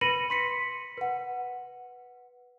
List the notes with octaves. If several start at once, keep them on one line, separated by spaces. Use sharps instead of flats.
B4 B5 A#6 C#7 D#7 F#7
C6 B6 C#7
B4 F#5